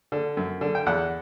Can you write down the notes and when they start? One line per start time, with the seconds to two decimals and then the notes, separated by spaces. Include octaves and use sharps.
0.12 D3
0.37 F#2
0.61 D3
0.75 G5
0.86 E2 F#5